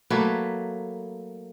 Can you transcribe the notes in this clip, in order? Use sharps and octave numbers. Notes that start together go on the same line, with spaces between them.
F#3 A3 A#3 B4